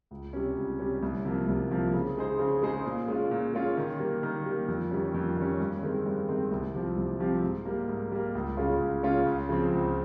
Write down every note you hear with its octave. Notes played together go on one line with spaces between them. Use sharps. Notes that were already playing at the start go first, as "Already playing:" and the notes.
C#2
C3 G3 C#4
C#2
C3 G3 C#4
C2
C3 F3 A#3
C2
C3 F3 A#3
C#3
G#3 D#4 G#4 C5
C#3
G#3 D#4 G#4 C5
A#2
G#3 C#4 F4
A#2
G#3 C#4 F4
D#3
G3 A#3
D#3
G3 A#3
F2
D#3 G3 C#4
F2
D#3 G3 C#4
G2
D#3 G#3 C4
G2
D#3 G#3 C4
C2
C3 F3 C4 G4
C2
C3 F3 C4 G4
G#2
G3 A#3
G#2
G3 A#3
C#2
C#3 G#3 C#4 F4
C#2
C#3 G#3 C#4 F4
C#2
C#3 F3 C4
C#2